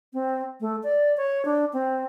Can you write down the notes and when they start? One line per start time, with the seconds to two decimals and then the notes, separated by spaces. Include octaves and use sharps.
0.14 C4
0.61 A3
0.83 D5
1.17 C#5
1.45 D4
1.73 C4